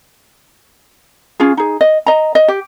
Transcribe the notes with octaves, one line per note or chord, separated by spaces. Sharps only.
C#4 F4 G#4
D#4 G#4
D#5
D#5 A#5
D#5
G4